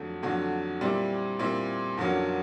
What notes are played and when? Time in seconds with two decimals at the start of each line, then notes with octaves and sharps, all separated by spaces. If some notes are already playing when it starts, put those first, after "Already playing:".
Already playing: F2 D3 F#3 A3
0.23 F2 D3 F#3 A3
0.81 A#2 G3 C4 E4
1.39 A#2 G3 C4 E4
1.97 F2 D3 F#3 A#3 C#4